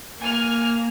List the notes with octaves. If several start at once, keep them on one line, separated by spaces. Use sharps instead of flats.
A#3 G#5 F6